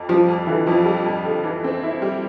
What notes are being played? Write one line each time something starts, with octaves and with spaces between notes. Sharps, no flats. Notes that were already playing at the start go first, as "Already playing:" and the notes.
Already playing: F2
F3 G3
F2
D3 E3
F2 F3
G3
F2
D3
E3
C4
E4
G3